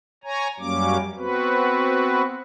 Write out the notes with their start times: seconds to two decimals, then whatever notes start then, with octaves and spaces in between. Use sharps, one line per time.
0.24 C#5 G#5 A#5
0.60 F#2 F#3 G3 A#3 C#4 D6
1.17 B3 C4 F#4 B4